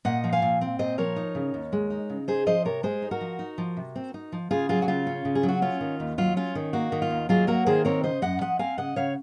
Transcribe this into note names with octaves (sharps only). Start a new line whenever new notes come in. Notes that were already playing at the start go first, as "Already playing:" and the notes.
A#2 D#5 F#5
F3
F5 G#5
A#2
C4
A#2 C5 D#5
F3 A#4 C#5
D#4
C#3
D#2
G#3
D#4
C#3
D#4 G#4 C5
F3 C5 D#5
C3 A#4 C#5
G#3 G#4 C5
D#4
F#4 A#4
F3
D#4
F3
C3
C4
D#4
F3
C#3 F4 G#4
F#3 F4 G#4
F#4
C#3 F4
C#4
C#3
G#4
F#3
F#4
C#4 F4
D#3
D#2
F#3 F4
C#4 F4
D#3
A#3 F#4
D#3
F4
D#2
F#3 F4 G#4
A#3 F#4 A#4
D#3 G#4 C5
C4 A#4 C#5
C#3 C5 D#5
F#2 D#5 F#5
F3 D#5 F#5
C4 F5 G#5
C#3 D#5 F#5
C#3 C#5 F5